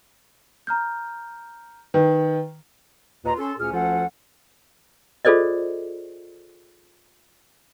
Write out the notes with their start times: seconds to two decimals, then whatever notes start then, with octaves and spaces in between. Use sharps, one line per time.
0.67 A#5 F6 G6
1.94 D#3 B4 G5
3.25 D#2 A#2 F4 B4 D#5 A#5
3.37 C#4 A4 C6
3.59 D2 A#2 C#4 G#4 F6
3.73 D2 F3 C#4 F4 A4 F#5
5.25 F4 G#4 A4 C5 D5 D#5